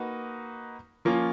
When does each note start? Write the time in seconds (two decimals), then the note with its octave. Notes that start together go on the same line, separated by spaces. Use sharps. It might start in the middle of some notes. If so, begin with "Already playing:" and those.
Already playing: A#3 D#4 F#4 B4
1.05 F3 A#3 C#4 F4